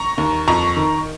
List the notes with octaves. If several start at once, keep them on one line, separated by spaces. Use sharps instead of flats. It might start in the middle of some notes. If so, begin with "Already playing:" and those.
Already playing: A#5 C#6
D#2
F2 A#5 C#6
D#3